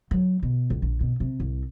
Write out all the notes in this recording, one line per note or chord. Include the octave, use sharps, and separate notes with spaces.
F#3
B2
C#2
A#1
B2
C3
C2